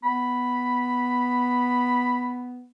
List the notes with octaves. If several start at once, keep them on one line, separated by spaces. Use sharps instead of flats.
B3 B5